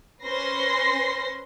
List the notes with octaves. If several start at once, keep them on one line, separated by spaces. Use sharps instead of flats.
C#4 B4 C5 C6 A#6 C7